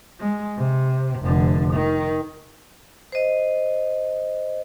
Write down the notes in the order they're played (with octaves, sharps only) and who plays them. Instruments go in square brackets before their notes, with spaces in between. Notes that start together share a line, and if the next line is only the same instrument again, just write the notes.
[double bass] G#3
C3
F1 D3
D#3
[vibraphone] C5 D#5